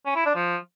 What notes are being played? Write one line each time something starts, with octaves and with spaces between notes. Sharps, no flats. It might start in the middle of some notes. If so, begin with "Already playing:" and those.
C#4
E4
D4
F3